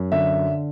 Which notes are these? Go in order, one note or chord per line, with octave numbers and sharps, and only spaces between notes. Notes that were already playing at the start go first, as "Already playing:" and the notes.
Already playing: F#2
D3 E5